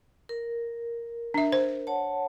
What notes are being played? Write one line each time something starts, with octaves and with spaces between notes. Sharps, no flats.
A#4
D4 E5
C5
C#5 F#5 A5